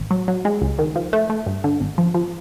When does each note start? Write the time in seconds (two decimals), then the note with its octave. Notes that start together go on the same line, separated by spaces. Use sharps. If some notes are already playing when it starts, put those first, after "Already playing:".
Already playing: A1
0.11 F#3
0.28 F#3
0.45 G#3
0.61 C#2
0.79 D#3
0.95 F3
1.13 A3
1.30 A3
1.46 G2
1.64 D3
1.80 G#1
1.98 F3
2.14 F3